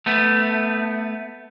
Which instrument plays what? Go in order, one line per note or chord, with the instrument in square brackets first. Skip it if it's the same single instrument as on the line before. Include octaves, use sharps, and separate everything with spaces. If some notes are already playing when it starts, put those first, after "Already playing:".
[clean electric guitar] A3 B3